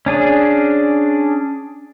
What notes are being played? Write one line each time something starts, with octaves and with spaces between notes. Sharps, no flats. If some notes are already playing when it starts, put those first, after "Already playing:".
C#4 D4 G#4